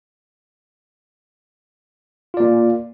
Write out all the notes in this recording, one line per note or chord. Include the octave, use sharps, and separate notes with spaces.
A#3 F4 D5